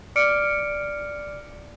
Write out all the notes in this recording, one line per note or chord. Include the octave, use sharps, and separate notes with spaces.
D5 D6 F6 C#7 D7